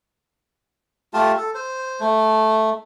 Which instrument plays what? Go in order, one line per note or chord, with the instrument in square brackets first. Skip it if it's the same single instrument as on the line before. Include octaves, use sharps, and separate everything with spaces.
[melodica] A3 F4 G4 A5
A4
C5
A3